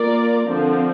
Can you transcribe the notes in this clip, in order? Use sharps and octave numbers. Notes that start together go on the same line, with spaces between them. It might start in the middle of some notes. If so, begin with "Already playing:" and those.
Already playing: A#3 F4 A#4 D5
D3 F3 C4